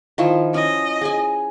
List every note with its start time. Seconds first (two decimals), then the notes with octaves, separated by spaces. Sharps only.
0.18 D#3 F3 E4
0.54 C#4 D#5
1.01 G#4 G#5